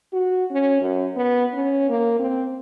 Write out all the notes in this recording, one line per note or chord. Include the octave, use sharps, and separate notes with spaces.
F#4
C#4
F#2
B3
C#4
A#3
C4